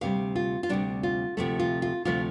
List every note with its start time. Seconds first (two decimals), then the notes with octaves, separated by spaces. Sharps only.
0.01 D2 C3 G3 F5
0.36 F4
0.63 F4
0.69 D2 C3 G3 D4
1.03 F4
1.37 D2 C3 F3 A3 A4
1.60 F4
1.82 F4
2.05 D2 C3 F3 A3 F4